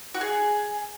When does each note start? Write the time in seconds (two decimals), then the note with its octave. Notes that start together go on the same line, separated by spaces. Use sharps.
0.14 F#4
0.21 G#4